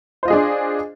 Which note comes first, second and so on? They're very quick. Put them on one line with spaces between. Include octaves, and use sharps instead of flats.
C5 F4 D#5 G#4 D4